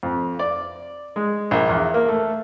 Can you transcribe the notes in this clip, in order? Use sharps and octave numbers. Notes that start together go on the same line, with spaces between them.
F2
D5
G#3
A#1
E2
A#3
A3